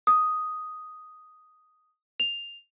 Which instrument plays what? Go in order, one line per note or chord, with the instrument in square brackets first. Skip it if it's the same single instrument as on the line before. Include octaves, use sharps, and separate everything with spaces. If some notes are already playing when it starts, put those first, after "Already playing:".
[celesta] D#6
F7